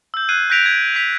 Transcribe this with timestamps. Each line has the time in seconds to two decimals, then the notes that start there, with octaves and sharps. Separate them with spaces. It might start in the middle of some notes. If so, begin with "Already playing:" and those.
0.14 E6 G6
0.29 F#6 G#6 C7 D#7
0.50 F#6 G6 A#6 B6 D7 F7
0.66 G#6
0.95 B6 F7